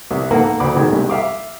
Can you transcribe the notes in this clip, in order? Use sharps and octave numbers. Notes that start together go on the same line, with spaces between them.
C2
G#2 A#3 B3 A4 F#5
D2 B5 D6
B2 D#3 G#3
C2 G2
E5 F5 D6